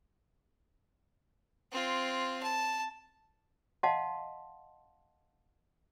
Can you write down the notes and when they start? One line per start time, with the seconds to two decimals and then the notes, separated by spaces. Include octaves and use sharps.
1.71 C4 F4
2.42 A5
3.83 D#5 F5 F#5 A5 C6